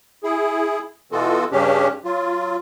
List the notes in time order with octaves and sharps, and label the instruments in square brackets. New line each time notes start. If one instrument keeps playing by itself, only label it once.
[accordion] E4 G#4
B2 E3 B3 F4 F#4 A4
G2 C#3 C#4 D4 G4
F#3 F4